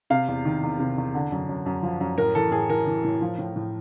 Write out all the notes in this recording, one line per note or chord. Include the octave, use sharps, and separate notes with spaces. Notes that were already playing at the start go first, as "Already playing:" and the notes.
C3 F5
E2
D#3
E2
C3
E2
D3
F#2
F#2
F#2
F3
F#2
A2 A#4
E3 A4
A2 G#4
E3 A#4
E3
A2
F3
A2
A2